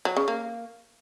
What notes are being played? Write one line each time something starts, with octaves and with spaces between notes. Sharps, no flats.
F#3
C#3
A#3